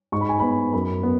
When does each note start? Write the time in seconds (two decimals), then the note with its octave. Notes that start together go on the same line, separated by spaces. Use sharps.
0.12 G#2 C#6
0.21 B5
0.29 G#5
0.39 B3 B5
0.73 F#2 B5
1.03 B3